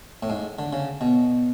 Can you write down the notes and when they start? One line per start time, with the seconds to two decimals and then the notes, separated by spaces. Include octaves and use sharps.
0.23 A2
0.30 G#2
0.59 D3
0.73 C#3
1.01 B2